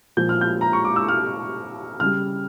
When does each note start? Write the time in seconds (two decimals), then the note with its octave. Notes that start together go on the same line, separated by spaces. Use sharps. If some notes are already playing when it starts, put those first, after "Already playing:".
0.17 A#2 F3 G6
0.29 F6
0.41 G6
0.61 A#5
0.73 C#6
0.85 D6
0.96 E6
1.08 F6
2.00 C#3 G3 F6